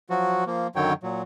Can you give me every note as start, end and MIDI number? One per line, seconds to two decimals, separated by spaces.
0.10 0.44 53
0.10 0.44 54
0.10 0.44 66
0.47 0.67 53
0.47 0.67 58
0.76 0.93 42
0.76 0.93 50
0.76 0.93 51
0.76 0.93 54
0.76 0.93 73
0.76 0.93 79
1.03 1.22 46
1.03 1.22 54